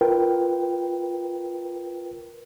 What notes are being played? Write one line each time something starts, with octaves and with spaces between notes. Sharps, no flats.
F4 A#4 B4 G5